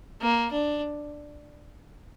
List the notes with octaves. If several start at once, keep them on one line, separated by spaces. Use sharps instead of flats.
A#3
D4